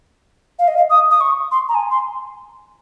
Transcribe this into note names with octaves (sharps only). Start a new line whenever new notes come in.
F5
D#5
F5
D#6
D#6
C#6
C6
A#5
G#5
C6